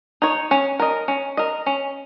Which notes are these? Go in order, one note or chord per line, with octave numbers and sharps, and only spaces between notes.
D#4 C#5
C#4
A#4 D#5
C#4
A#4 D#5
C#4